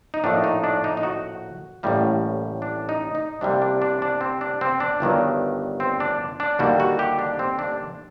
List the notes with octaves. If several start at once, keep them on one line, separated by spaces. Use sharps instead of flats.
D#4
A#1 A2 A3 D4
D#4
D4
D#4
D#4
F#4
A1 A2 G3 A#3
D4
D#4
D#4
C2 C3 G3 A#3 D4
D4
D4
D4
C4
D4
C4
D4
G1 G2 D#3 F#3
C4
D4
D4
D#2 D3 G3 A#3 F#4
F#4
G4
D4
C4
D4